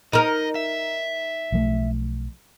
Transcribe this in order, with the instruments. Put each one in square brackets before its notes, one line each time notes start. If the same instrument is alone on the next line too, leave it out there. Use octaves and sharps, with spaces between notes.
[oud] D#4 A#4 [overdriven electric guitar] D#5
[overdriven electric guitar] E5
[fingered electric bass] B1 F3 A3